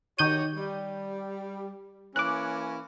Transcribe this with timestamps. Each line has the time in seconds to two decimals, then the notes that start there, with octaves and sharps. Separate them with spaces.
0.19 D#3 F#4 G4 C#5 G6 D#7
0.56 G3
2.16 E3 A#3 C#4 D6 F#6